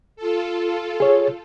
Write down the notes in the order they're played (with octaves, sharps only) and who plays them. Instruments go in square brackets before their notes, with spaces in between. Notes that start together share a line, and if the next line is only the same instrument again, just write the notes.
[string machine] F4 A4
[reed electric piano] G#4 C#5